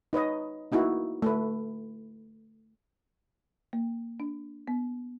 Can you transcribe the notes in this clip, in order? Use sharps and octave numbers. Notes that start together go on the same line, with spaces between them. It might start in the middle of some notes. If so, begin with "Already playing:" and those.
D#4 B4 C#5 D#5
A#3 D#4 E4 F#4
A3 B4
A#3
D4
B3